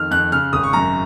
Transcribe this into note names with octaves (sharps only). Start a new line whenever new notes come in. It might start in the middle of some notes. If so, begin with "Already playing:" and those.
Already playing: F2 D#3 F6
F2 F#6
C#3 F6
G#1 D#6
C#6
F#2 A#5